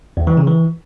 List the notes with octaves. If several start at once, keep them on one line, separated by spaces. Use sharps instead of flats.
E2
E3
C#3
E3